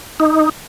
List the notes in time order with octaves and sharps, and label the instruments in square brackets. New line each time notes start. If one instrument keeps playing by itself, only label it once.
[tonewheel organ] D#4